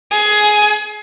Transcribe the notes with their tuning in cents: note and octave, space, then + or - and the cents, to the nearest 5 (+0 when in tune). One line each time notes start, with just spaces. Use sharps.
G#4 +15